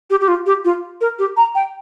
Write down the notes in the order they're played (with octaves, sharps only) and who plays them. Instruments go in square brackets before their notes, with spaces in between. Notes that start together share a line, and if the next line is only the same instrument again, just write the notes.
[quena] G4
G4
F4
G4
F4
A#4
G4
A#5
G5